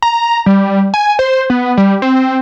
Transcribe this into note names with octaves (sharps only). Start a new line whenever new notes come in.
A#5
G3
G#5
C5
B3
G3
C4